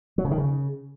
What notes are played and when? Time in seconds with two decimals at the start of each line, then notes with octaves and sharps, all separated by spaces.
0.18 F#3
0.25 C#3
0.31 D#3
0.38 C#3